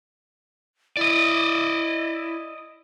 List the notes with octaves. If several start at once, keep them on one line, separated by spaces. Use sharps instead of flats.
E4 D5 D#5